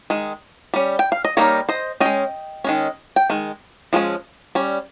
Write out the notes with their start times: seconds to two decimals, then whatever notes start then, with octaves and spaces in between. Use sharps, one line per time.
0.10 D#3 G#3
0.74 G3 C#4
0.99 G5
1.12 F5
1.25 D#5
1.37 G3 A#3 D#4 A#4 C#5
1.69 C5 D#5
2.00 G#3 C#4 D#5 G5
2.64 D#3 G#3 C#4
3.16 G5
3.30 D#3 G#3
3.93 F3 G#3 C#4
4.55 G3 C#4